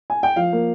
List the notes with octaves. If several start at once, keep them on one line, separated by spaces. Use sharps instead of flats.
G#5
G5
F3 F5
A#3